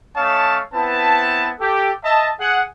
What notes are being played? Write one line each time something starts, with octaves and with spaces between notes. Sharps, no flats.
A3 C#4 C#5 D#5 F5 A5
B3 C4 E4 B4 A5
G4 A4
D#5 E5 A5
G#4 F#5